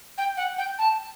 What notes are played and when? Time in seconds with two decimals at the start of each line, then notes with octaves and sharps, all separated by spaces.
0.18 G5
0.37 F#5
0.58 G5
0.79 A5